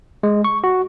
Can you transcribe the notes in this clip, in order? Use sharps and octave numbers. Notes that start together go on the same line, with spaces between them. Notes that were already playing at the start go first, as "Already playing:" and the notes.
G#3
C#6
F#4